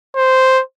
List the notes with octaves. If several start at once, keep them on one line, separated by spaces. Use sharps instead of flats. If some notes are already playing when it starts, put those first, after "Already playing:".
C5